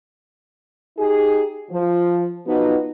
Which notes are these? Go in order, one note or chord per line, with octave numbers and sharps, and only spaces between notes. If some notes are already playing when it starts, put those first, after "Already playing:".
D#4 G4 G#4
F3
F3 B3 D#4 F#4